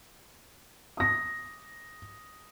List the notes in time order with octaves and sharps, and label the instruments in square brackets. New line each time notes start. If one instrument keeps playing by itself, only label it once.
[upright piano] D#6 A#6